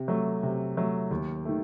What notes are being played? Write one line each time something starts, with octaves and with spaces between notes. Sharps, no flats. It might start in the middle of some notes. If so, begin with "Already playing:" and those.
Already playing: C3
F#3 A3
C3
F#3 A3
D#2
D#3 A3